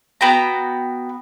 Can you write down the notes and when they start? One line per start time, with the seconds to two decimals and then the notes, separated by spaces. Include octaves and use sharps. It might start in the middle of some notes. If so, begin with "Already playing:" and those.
0.21 B3 F#4 G5 A#5